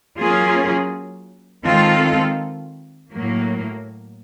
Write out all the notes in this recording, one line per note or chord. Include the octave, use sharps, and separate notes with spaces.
F#3 A#3 C#4 F4 G#4
D#3 G#3 C4 F4 A4
A2 F#3 A#3